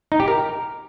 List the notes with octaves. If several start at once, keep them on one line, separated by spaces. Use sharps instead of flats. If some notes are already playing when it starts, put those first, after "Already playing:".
D#4
G4
A#4